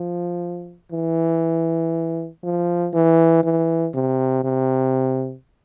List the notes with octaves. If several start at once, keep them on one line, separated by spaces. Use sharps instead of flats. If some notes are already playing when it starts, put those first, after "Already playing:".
Already playing: F3
E3
F3
E3
E3
C3
C3